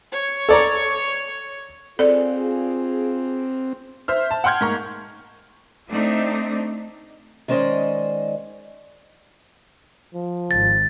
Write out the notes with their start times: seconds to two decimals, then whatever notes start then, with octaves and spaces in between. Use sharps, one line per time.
0.13 C#5
0.49 A4 D5 A#5
1.99 C4 F4 G#4 A4 D5
4.08 C5 E5 F6
4.31 A5
4.44 F#5 G5 C6 F6 G6 G#6
4.61 G#2 A#3 A#5 C#6
5.89 A3 C4 D4 D#4
7.48 D#3 G#3 C#4 C5 D5 D#5
10.15 F3
10.51 G#1 A6